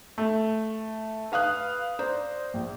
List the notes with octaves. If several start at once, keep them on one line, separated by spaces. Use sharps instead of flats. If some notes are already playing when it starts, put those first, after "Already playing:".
A3
B4 F5 D#6 F#6
C5 D5 A#5
A#1